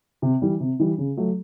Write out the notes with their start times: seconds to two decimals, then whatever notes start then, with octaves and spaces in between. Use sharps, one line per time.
0.22 C3
0.42 E3 G3
0.60 C3
0.79 E3 G3
0.98 C#3
1.17 F#3 A3